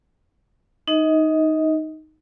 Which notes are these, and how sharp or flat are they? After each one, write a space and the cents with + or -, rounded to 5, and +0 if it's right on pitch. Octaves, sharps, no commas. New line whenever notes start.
D#4 +0 D#5 +30